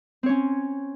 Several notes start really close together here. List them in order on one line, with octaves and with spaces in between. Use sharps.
C4 C#5 C#4